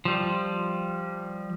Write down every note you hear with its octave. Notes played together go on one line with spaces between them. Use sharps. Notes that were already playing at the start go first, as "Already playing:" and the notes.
F3 G3